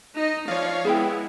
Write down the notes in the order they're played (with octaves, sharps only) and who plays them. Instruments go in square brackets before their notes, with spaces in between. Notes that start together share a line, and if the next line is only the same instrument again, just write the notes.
[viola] D#4 D#5
[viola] F3 [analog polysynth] C#5 F5 [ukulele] D5
[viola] G#3 [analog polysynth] B3 E4 [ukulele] G#4 G5